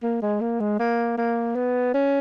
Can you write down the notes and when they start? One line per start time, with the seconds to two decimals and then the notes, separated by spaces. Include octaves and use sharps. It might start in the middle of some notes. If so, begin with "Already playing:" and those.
0.03 A#3
0.22 G#3
0.41 A#3
0.60 G#3
0.79 A#3
1.18 A#3
1.56 B3
1.94 C#4